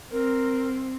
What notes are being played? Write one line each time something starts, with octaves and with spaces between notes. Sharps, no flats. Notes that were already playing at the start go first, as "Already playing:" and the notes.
C4 A#4